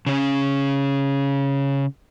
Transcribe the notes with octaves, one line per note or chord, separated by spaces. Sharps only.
C#3 C#4